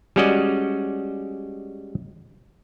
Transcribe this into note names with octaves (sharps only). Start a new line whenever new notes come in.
G3 G#3 C#4 F#4 D5 D#5